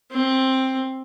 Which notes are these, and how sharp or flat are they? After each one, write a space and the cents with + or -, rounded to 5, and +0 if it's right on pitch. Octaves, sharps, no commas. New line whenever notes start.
C4 +10